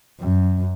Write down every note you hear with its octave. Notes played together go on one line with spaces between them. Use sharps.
F#2